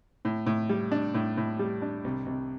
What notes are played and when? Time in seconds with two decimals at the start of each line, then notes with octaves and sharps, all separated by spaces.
0.25 A2
0.46 A2
0.69 G3
0.92 D4
1.14 A2
1.37 A2
1.59 G3
1.82 D4
2.04 C2
2.26 C2